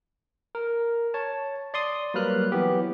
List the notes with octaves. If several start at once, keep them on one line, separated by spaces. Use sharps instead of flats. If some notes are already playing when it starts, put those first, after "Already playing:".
A#4
C#5 A5
D5 C6 D#6
F#3 G3 A#3 B4 F6 F#6
E3 F#3 B3 G4